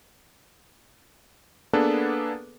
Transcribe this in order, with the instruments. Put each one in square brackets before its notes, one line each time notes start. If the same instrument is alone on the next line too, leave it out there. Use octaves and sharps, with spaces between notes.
[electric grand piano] A#3 B3 D4 G#4 A4 B4